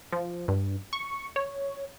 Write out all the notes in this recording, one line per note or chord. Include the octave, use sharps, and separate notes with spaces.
F3
G2
C#6
C#5